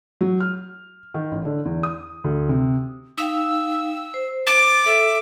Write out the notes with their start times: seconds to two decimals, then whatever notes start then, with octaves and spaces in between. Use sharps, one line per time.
0.21 F#3
0.40 F6
1.14 D#3
1.32 A1
1.45 D3
1.65 E2
1.83 D#6
2.24 D2
2.49 C3
3.18 D#4 F5 G5 E6
4.14 C5
4.47 D6 A6
4.86 A4 E5